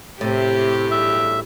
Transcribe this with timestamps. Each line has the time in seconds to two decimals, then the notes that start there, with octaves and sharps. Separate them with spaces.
0.21 A2 C3 G4
0.91 B1 E2 G2 E5